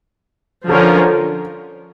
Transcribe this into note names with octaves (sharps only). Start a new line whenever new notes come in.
D3 F3 C#4 F4 A4 A#4